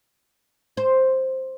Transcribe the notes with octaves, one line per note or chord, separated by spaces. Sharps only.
C5